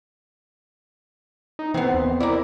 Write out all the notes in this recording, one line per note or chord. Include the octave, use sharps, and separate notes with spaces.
D#4
E3 B3 C4
D#2
E4 A#4 D5